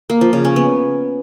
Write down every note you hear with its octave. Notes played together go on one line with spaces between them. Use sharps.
A#3
F3
C#3
C#4
B3